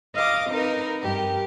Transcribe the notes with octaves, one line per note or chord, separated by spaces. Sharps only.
D#5 F5 D6 D#6
C4 D#4 A#4 B4
G2 G4 A#4